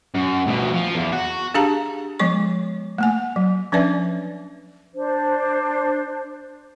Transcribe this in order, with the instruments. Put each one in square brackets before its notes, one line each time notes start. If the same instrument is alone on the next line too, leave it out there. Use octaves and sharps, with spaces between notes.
[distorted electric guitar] F#2
D2 B2
F3
E2
F#4
[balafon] D4 G4 G#4 F5 A5 A#5
F3 G#3 B3 C#5 C#6
A3 A#3 G#5
F#3
F3 C#4 D4 B4 D5 E5
[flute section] D4 C5